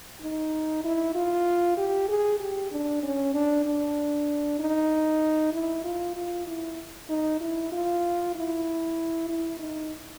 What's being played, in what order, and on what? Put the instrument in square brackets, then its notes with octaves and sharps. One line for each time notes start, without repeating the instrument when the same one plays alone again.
[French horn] D#4
E4
F4
G4
G#4
G4
D4
C#4
D4
D4
D#4
E4
F4
F4
E4
D#4
E4
F4
E4
E4
D#4